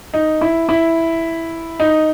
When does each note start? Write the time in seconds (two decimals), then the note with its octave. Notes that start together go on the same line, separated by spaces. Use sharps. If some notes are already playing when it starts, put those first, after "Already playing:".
0.14 D#4
0.41 E4
0.69 E4
1.80 D#4